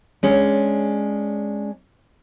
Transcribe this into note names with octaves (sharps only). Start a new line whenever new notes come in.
G#3 C#4 D4